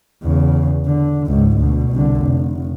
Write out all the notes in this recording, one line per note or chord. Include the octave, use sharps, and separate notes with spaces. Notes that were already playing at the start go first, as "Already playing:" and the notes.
E2 C#3
D3
C#2 G#2
D2 B2
C2 D3
F1